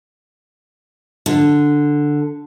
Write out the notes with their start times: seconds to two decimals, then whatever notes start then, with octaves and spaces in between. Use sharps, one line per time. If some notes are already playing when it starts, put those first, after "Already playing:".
1.26 D3